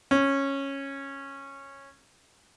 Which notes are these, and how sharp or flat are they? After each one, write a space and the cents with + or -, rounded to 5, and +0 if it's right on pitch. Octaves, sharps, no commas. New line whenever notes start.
C#4 -10